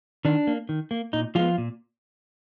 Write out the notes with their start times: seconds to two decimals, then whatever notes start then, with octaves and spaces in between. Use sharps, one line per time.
0.25 D#3 D4
0.47 A#3
0.69 D#3
0.91 A#3
1.13 A#2 D#4
1.35 F3 G#3 B3 F4
1.58 A#2